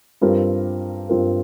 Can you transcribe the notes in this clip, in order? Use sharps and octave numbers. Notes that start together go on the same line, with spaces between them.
G2 G3 C4 F4 A#4
G2 G3 C4 F4 A#4